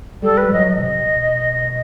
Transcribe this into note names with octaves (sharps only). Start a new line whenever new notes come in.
G3 A4
B4
F#3 D#5
D#5
C3
B2